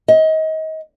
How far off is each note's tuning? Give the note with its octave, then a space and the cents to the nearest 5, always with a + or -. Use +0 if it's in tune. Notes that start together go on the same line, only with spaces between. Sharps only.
D#5 +30